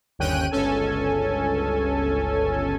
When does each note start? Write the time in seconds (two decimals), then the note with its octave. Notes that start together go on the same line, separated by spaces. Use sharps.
0.19 G1 D#2 C#4 G5 F#6 D#7
0.51 G1 C#2 C#4 A4 G#5